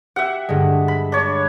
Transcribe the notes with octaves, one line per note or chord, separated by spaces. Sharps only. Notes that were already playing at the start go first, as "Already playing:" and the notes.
G4 E5 F#5
G2 D3 G#3
B5
D4 C#5